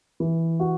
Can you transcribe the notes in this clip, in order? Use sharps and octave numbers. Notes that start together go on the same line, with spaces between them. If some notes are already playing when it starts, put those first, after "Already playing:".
E3
F#4